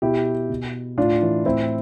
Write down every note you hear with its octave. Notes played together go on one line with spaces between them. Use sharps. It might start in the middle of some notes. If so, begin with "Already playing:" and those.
B2 E4 G4
B2
A2 D4 F4
E3
A2 C4 E4